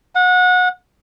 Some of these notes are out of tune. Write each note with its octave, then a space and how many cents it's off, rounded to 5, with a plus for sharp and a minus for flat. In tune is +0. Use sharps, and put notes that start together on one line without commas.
F#5 -30